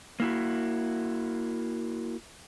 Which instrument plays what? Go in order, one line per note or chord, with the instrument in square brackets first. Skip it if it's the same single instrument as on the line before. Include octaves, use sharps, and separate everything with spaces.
[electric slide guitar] A#3 E4 F#4